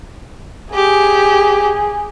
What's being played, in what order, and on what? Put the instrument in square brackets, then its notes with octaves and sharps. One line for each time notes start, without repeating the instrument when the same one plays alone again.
[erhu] G4 [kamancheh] G#4